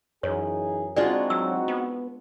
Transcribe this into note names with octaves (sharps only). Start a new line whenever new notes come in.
F#2 E3 D#4 G#4 C#5
G#3 C4 D4 D#4 F4 F#4 D5
F#3 E6
B3